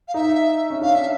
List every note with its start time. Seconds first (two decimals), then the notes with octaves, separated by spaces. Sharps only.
0.07 F5
0.14 D#4 E5
0.70 C#4
0.81 D4 F5
0.94 E5